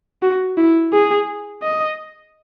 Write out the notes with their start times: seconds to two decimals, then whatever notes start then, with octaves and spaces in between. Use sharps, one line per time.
0.22 F#4
0.57 E4
0.93 G#4
1.63 D#5